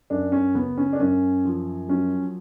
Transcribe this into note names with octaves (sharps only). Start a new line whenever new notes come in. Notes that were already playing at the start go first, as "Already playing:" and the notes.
F#2 D4
C#4
F#1 B3
C#4
D4
F#2 C#4
F3
F#3 C#4